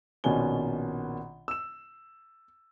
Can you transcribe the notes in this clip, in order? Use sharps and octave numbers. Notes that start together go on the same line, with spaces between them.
A#1 B2 D#3 C#4 G#5 G7
E6 E7